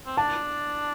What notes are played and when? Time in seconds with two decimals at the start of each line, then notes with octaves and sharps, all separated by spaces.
0.06 C4
0.17 D4 A5